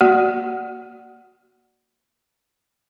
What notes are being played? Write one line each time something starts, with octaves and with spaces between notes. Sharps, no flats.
A#3 F#4 D5